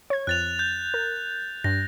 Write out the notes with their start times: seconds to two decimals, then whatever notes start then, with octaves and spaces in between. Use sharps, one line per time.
0.10 C#5 G#6
0.27 F2 F#6 A6 F7
0.59 G6
0.94 A#4
1.64 G2 A#6